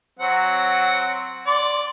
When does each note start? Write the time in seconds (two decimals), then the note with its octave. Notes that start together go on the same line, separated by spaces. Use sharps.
0.19 F#3 C4 F#5
1.47 D5 C6